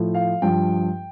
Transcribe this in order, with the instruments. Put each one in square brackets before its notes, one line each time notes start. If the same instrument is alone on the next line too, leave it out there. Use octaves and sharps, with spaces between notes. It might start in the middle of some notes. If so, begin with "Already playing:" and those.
Already playing: [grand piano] A2 F3
F5
G2 F3 G5